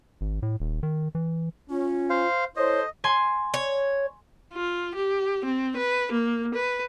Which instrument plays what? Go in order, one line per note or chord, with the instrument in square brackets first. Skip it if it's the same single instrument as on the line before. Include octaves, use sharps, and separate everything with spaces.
[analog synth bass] G#1
A2
D#1
D#3
E3
[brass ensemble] C#4 [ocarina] F4
[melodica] C5 F5
[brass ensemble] E4 A4 C5 [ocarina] C#5 [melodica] D#5
[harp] G#5 C6
[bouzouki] C#5
[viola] F4
G4
C4
B4
A#3
B4